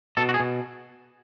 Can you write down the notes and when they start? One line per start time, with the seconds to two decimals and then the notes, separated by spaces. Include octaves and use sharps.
0.17 B2 A4
0.29 F#4
0.34 G#4
0.40 B2